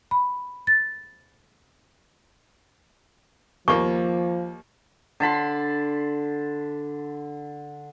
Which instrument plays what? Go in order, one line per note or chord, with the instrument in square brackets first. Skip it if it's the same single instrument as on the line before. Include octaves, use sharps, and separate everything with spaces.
[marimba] B5
A6
[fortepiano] D#2 A#3 [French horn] F3 [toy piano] C#6
[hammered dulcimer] D3 A5 B5 C6